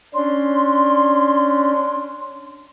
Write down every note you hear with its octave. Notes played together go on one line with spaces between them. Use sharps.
C#4 D4 C6